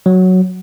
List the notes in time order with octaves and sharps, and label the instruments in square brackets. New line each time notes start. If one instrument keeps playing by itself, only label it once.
[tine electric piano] F#3